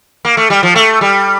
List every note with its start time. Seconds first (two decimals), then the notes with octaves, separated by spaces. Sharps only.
0.25 A#3
0.37 A3
0.50 G3
0.63 F3
0.76 A3
1.01 G3